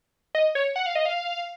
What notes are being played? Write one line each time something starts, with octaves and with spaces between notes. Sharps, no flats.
D#5
C#5
F#5
F5
D#5
F5